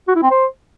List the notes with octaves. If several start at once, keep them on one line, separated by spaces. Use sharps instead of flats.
F#4
E4
C4
C5